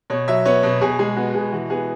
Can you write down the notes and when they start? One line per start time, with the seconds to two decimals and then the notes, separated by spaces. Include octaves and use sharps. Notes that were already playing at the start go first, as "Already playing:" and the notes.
0.10 B2 C#5
0.28 F#3 E5
0.45 B3 C#5
0.63 B2
0.81 B2 G#4
0.99 G#3 G#4
1.17 B3 F#4
1.34 B2 G#4
1.52 E3 F#4
1.70 B3 G#4